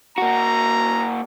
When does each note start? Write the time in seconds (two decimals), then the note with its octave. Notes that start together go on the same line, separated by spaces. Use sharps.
0.18 A#3 F#4 A#5